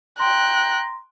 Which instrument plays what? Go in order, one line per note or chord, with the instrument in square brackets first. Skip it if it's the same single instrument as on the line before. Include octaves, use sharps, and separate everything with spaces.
[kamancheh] G5 [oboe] A#5 [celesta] C6 [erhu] F#6